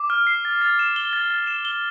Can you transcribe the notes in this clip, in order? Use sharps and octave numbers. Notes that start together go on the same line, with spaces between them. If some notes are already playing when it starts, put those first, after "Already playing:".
Already playing: D6
F6
C7
A6
A6
E7
G7
A6
A6
E7
G7